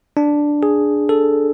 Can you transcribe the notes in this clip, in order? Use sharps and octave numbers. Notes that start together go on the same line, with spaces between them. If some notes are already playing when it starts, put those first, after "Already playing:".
D4
G#4
A4